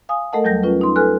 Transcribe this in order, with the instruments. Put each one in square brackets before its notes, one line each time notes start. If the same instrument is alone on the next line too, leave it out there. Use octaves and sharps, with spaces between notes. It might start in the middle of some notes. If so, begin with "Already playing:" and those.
[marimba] F5 G#5 D#6
A3 A4 A#4 D#5 F#5 A5
E2 F#3 G3 G6 A#6
C#4 F4 B4
D#4 C6
A4 B4 G#5 F6 F#6